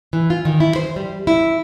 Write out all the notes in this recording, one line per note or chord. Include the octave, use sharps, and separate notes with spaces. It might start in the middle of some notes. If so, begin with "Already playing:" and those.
E3
F4
D#3
E4
C5
G3
E4